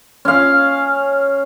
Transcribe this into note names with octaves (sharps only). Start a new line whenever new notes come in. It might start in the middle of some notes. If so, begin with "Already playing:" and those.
C#4 F5